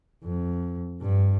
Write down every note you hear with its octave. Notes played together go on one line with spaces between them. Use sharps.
F2
G2